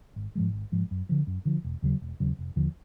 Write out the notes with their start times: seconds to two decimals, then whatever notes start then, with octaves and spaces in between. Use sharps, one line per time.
0.16 G#1
0.35 G#2 F3 G#3
0.53 G#1
0.72 G#2 F3 G#3
0.91 F#2
1.09 D3 F3
1.27 F#2
1.45 D3 F3
1.64 E1
1.82 D#2 C#3 F#3
2.02 E1
2.20 D#2 C#3 F#3
2.39 F1
2.56 D#2 D3 F3